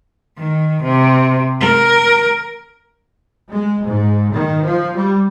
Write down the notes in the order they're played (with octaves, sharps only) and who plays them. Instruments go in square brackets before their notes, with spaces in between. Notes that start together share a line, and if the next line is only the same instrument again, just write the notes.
[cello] D#3
C3
A#4
[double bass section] G#3
G#2
D#3
F3
G3